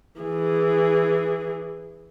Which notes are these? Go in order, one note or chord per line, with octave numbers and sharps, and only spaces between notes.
E3 G#4